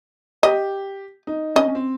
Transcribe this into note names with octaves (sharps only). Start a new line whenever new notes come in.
G4 D#5
D#4
C#4 D#5
C#4
C4